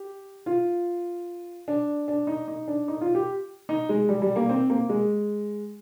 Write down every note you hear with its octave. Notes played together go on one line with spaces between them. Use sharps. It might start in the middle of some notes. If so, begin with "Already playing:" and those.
Already playing: G4
F4
D4
D4
D#4
D#4
D4
D#4
F4
G4
D#4
G#3
G3
G3
A#3
C4
A#3
G#3